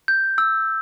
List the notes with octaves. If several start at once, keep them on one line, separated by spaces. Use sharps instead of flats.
G6
E6